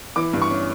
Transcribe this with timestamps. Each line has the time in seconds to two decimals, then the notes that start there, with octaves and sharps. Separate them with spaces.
0.16 E3 D6
0.33 G2
0.42 C#6
0.50 C#4